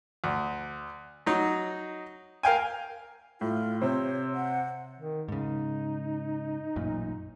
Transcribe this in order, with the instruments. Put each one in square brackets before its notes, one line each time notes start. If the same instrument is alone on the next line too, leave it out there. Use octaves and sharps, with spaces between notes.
[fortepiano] D2
F#3 D#4
A#4 F5 G5 G#5
[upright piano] A2 [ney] F4
[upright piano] C3 C4 C5 [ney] C#5
[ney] F#5
[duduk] D#3
[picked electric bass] G#2 C#3 [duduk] D#4
[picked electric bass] A1 F#2 A#2